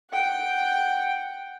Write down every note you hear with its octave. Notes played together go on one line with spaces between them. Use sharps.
F#5 G5